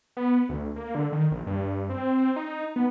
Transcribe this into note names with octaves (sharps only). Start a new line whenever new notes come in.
B3
D2
A#3
D3
D#3
A#1
G2
C4
D#4
B3